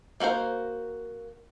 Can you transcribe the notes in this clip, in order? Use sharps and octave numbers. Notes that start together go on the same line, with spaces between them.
A#3 F#4 A#4 C5